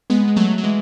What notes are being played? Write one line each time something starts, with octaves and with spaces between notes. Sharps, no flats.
G#3 B3
G#3
F#3 A3
F#3
E3 G#3